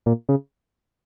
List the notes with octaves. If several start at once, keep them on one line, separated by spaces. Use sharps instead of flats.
A#2
C#3